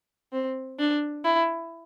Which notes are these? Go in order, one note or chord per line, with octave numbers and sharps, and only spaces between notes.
C4
D4
E4